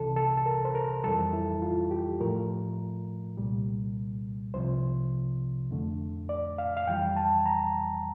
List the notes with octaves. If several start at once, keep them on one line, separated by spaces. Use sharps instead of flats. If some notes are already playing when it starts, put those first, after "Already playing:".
Already playing: C2 C3 E3 A4
A4
A4
A#4
C5
A#4
F2 E3 G3 A4
E4
F4
G4
A2 F3 A3 A#4
C2 A#2 G3
C2 C3 F3 C5
F2 D3 A3
D5
F5
F5
F2 E3 G3 G5
A5
A#5